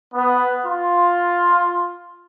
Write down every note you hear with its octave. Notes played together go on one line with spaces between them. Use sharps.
B3
F4